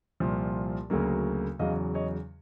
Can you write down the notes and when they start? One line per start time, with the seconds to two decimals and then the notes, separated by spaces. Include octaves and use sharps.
0.20 C2 A#2 F3
0.90 D2 C#3 F#3 A#3
1.59 E2 C#3 F#3 D#5 F5
1.94 C#5 D#5